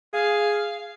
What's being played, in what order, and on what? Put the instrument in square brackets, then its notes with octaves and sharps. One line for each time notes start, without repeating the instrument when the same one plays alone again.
[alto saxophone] G#4 [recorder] F5